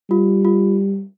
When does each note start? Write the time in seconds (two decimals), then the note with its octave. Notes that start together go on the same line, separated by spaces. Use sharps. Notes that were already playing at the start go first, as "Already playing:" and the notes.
0.10 G3 F4
0.45 F4